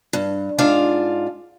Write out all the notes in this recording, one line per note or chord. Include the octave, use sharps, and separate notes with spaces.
G2
G#2 D4 F4 F5